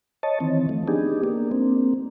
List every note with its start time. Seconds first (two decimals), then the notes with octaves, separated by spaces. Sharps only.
0.23 C#5 D#5 A5
0.40 D#3 E3 C4
0.69 F3 A3
0.88 B3 D4 D#4 G4 G#4
1.24 A#3 D4
1.51 A#3 C4